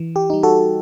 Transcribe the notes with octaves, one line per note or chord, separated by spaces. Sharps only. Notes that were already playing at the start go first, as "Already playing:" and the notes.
Already playing: E3
G4
G3 D#4
F#4 A4